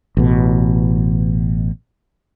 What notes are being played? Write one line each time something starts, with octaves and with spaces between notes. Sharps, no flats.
A1 B2